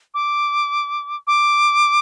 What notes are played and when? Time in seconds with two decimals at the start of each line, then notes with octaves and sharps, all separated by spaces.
0.14 D6
1.27 D6